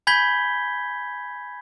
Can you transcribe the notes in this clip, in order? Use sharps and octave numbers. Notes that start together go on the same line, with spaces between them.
G#5 B5 G6 G#6 B6 G7